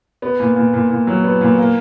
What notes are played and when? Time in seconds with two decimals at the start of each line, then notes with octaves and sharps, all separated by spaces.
0.22 B3
0.40 A#2
0.56 A#2
0.74 A#2
0.90 A#2
1.07 F#3
1.24 B3
1.41 A#2
1.58 A#3